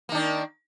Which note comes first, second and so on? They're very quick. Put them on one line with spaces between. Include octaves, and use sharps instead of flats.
A#3 D#3 D4